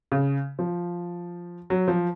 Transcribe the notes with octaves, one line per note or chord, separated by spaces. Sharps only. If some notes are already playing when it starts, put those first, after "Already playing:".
C#3
F3
F#3
F3